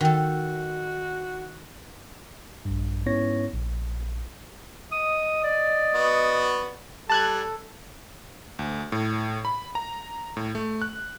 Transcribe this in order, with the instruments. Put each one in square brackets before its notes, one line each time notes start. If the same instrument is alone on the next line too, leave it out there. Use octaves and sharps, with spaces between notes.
[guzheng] D#3 A4 [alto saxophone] F#4
[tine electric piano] A#1 G2
G#2 B3 C#4 E4 C#5 A#6
A#1
[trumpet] D#5 [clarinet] D#6
[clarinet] D5
[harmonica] B3 F#4
[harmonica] G3 [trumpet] A4 [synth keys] A5 F#6 G#6
[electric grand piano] D2
A2
B5
A#5
A2
A3
F#6